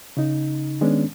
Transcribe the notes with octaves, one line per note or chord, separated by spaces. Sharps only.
C#3 D#4
D#3 G#3 B3 C#4 D4